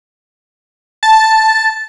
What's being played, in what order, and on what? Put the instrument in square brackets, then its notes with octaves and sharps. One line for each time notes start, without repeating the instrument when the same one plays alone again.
[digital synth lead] A5